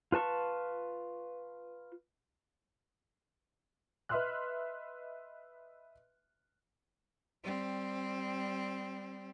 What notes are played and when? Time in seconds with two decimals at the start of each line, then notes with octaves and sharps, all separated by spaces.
0.12 F4 B4 A5 C#6
4.09 B4 D#5 E5 C6 F6 F#6
7.43 G3 C4